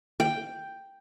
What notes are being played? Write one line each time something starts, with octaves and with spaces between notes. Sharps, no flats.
G5